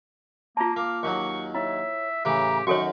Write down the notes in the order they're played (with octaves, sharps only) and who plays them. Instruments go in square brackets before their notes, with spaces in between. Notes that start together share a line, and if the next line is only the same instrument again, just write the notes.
[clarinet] A#3 [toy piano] F4 A5 [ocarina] A#5
[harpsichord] A#3 [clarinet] F5 [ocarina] D6
[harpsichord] D#2 D#3 F#3 [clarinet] C#6
[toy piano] E4 [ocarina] C#5 [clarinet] E5
[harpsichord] A2 C#3 E3 [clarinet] G4 [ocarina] A#5
[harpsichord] F#2 D#3 [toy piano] F#4 A4 C#5 [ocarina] F#5 [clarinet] C#6